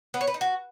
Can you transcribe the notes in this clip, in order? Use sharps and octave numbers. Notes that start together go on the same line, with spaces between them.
B3
C#5
B4
D#4
F#4